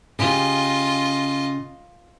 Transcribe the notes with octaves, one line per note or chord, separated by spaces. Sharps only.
C#3 F4 G4 D#5